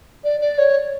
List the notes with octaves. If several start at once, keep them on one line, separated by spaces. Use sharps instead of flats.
D5
D5
C#5